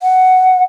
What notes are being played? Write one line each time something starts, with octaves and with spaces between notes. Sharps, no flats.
F#5